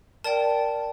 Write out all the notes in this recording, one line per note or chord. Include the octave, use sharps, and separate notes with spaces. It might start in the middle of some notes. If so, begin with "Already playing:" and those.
A#4 D5 G5 A5